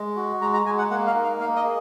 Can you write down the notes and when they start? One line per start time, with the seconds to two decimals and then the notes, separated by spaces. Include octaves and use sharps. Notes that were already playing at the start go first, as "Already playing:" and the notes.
Already playing: G#3
0.16 F#4
0.41 G#3 A#5
0.53 A#5
0.66 G#3 G#5
0.78 F#5
0.90 A#3 F#5
1.07 F5
1.15 D#4
1.23 F5
1.40 A#3 F5
1.56 D#5
1.64 G#4